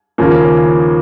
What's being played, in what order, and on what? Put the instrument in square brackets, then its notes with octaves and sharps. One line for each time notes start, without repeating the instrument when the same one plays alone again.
[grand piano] D#2 C#3 F3 A#3 C#4